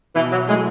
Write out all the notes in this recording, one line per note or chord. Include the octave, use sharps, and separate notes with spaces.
B2 E3
F#3
F#3 G#3 A3 E4